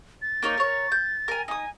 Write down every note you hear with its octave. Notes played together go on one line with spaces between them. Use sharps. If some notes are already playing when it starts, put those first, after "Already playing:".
A6
A#3 D#4 C#5
A#4 C#5
G6
A#4 G#5
D#4 G#5 D#6